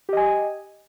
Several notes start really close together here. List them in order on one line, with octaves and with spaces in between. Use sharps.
G4 D#5 G#5